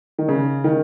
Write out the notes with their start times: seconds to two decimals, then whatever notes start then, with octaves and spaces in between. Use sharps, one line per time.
0.19 D#3
0.29 C#3
0.64 D#3